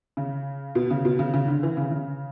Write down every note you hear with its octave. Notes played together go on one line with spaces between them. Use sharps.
C#3
B2
C#3
B2
C#3
C#3
D3
E3
C#3
C#3